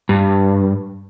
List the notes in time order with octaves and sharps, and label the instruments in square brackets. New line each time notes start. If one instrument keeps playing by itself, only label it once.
[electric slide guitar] G2